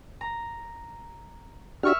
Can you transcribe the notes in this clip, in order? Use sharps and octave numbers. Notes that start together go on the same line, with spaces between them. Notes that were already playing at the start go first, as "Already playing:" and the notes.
A#5
D4 F#4 G4 E5 C#6 F6